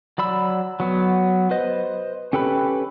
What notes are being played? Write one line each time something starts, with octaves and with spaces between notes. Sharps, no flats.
F#3 D5 B5 E6
F#3 B3
B4 C5 D#5
C#4 G4 A4 B4 B5